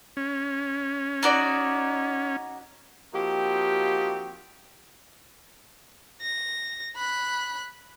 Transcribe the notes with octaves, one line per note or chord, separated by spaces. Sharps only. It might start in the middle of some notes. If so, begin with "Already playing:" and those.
C#4
D#4 F#4 D5
F3 A#3 C4 D#4 F#4 G4
A#6
B5 F#6